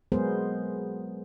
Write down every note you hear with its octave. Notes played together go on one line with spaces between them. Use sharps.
F#3 G#3 B3 G#4 A#4 C5